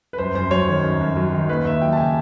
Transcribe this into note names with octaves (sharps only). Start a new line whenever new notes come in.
B4
F#2 C5
F#2 C5
F#3 C#5
D#3
F#2
F#2
F#3
D#3
D#2 B4
D#2 E5
F#3 G5
A5
C#3 G#5